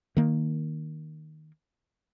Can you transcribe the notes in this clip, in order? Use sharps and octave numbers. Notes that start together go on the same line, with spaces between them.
D#3 A#3